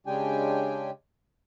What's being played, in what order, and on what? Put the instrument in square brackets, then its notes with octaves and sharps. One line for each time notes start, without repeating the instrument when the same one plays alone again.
[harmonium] C#3 G#3 D4 G4 G5 G#5